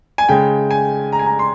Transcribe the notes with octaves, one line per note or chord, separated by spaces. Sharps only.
G#5
C#3 G#3 G5
G#5
A#5
G#5
A#5
C6